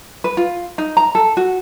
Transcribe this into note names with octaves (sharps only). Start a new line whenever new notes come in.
B4
F4
D#4
A#5
A4
F#4